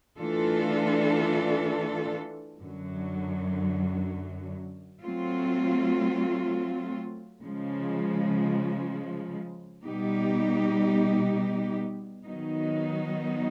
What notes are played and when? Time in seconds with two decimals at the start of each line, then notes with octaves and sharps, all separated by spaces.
0.19 E3 A3 D4 F4 A4
2.59 F#2 D3 F#3
5.02 F#3 A3 C4 F4
7.42 C#3 F3 G#3
9.84 B2 G3 B3 D#4 G4
12.25 D#3 F#3 B3 D#4